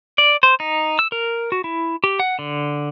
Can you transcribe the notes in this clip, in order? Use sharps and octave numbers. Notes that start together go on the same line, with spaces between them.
D5
C5
D#4
E6
A#4
F#4
E4
G4
F#5
D3